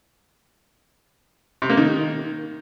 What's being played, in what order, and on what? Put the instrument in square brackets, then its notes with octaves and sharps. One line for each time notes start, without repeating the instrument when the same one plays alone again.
[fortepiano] C3
A#3
D#3